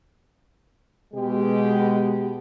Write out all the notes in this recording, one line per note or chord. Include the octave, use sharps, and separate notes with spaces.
B2 G#3 G4